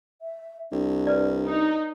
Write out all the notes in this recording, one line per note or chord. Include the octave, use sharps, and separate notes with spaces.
E5
C2 D4
B4 D5
D#4